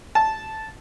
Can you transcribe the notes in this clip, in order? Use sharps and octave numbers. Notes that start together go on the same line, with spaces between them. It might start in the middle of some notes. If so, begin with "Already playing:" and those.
A5